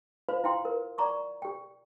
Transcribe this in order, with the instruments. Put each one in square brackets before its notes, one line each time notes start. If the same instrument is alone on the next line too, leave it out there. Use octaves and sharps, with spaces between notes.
[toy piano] F4 B4 C5 F5
E4 F5 G5 C6
A#4 B4
D5 F#5 A#5 C#6 D6
G4 G5